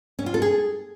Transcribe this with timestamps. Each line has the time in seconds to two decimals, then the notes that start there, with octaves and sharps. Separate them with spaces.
0.19 C#4
0.26 F4
0.34 A4
0.42 G#4